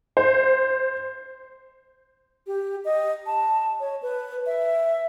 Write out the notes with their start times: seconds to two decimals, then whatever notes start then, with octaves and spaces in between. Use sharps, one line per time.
0.17 C5
2.47 G4
2.85 D#5
3.26 A5
3.80 C#5
4.03 B4
4.46 E5